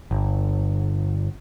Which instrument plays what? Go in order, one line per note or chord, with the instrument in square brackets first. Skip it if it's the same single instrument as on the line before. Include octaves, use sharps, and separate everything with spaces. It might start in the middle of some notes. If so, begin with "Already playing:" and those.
[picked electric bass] G1